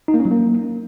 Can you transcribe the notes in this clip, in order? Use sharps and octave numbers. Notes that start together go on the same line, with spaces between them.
D#4
A#3
C#4
F#3
A#3